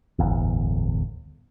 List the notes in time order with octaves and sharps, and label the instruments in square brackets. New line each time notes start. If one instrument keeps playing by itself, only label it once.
[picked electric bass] D1 G1 E2